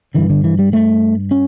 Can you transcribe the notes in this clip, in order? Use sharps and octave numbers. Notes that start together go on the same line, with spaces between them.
G2 D3 E3
D3
E3
G3
A3
C#4